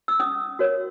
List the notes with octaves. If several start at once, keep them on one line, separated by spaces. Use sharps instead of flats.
E6
C#4 D#6
F#4 A#4 C#5